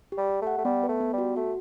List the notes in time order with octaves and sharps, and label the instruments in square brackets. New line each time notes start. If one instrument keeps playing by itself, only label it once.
[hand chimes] G4
[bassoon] G3
[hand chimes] G4
[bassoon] A3
[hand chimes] F#5
[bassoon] A3
[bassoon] G3 [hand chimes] B3
[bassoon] A3 [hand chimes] B4
[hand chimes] B3
[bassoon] G3
[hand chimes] F#4
[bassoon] A3 [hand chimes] F#4